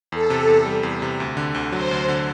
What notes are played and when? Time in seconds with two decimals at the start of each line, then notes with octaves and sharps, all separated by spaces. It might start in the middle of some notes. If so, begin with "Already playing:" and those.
0.12 E2 A4
0.30 C3
0.49 E2
0.65 G3
0.83 E2
1.02 C3
1.20 D2
1.37 D3
1.54 D2
1.72 F#3 C5
1.91 D2
2.08 D3